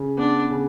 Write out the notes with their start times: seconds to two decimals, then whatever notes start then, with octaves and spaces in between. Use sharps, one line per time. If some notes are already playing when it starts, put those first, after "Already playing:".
Already playing: C#3
0.17 B3 D4
0.50 C#3